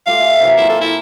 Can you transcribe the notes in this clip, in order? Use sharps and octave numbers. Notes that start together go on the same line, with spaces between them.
A3 F4 G4 F5
E5 G#5
C3 E3 F#3
A#3 E4 F4
A4
E4